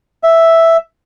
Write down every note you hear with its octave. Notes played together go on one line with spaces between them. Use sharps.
E5